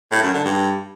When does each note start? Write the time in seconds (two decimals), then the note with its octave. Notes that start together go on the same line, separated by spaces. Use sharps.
0.12 A2
0.23 F#2
0.34 D3
0.45 G2